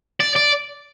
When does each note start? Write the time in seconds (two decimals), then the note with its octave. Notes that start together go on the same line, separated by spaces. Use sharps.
0.20 D5
0.36 D5